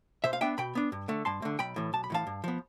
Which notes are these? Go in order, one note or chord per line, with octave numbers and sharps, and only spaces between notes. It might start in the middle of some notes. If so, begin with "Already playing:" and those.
B2 C5 E5
F5
B3 D4 E5 G5
B2 G5 B5
B3 D4
G2
D3 A3
G2 A5 C6
D3 A3
B1 G5 B5
A2 E3
B1 A5
B5
A2 E3 F5 A5
G2
F3 B3